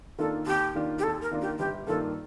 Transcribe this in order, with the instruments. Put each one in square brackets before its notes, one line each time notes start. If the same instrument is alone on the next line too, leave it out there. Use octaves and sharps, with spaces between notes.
[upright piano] D#3 A#3 D4 F4 [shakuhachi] A4
[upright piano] D#2 [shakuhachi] G4
[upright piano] D#3 A#3 D4 F4
[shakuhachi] G4
[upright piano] D#2 [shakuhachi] A4
[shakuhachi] A#4
[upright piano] D#3 A#3 D4 F4
[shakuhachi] G4
[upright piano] G1 [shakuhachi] G4
[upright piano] G2 D#3 A#3 F4 [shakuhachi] A4